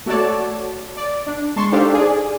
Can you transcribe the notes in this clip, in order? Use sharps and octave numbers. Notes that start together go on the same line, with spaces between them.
A3 F#4 A4 C#5 D5 A5
D5
D4
G#3 A5 C6 C#6
D4 D#4 G4 A4 C5 F5
G#4 D5